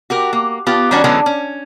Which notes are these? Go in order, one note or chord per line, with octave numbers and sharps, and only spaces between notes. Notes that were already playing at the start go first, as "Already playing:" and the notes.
F#4 G4 A#4
A#3
B3 F4 G4
D#3 G3 C#4 D4 F#4
D3 E3 F#3 G#3 B3 C#4
C#4